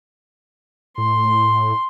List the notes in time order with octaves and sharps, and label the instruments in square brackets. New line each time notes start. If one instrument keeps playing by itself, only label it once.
[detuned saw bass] A2 [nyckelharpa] C6